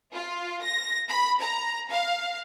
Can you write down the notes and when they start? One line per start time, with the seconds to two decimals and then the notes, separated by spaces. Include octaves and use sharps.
0.12 F4
0.62 A#6
1.09 B5
1.41 A#5
1.90 F5